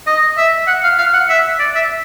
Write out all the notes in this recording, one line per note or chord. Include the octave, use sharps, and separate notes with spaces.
D#5
E5
F#5
F5
F5
F#5
E5
D5
E5